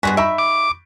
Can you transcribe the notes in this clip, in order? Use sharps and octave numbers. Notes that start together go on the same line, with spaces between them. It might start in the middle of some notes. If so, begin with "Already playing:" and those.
G2 B2 G#3 F#4 G#5 B6
D#4 E5 B5 C#6 D7
D6